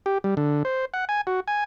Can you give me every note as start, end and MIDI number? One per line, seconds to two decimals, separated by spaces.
0.06 0.18 67
0.24 0.35 55
0.37 0.63 50
0.65 0.85 72
0.94 1.05 78
1.09 1.21 80
1.27 1.40 66
1.48 1.64 80